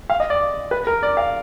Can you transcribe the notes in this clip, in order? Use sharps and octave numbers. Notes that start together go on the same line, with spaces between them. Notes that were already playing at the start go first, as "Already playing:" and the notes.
F5
D#5
D5
B4
A#4
D5
F5